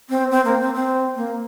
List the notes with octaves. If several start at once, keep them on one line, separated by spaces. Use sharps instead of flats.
C4
C4
A#3
C4
C4
A#3